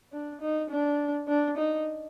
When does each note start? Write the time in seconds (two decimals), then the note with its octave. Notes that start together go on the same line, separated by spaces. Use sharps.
0.12 D4
0.41 D#4
0.70 D4
1.28 D4
1.57 D#4